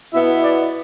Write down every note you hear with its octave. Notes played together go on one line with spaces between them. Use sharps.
B2 B3 E4 E5
D5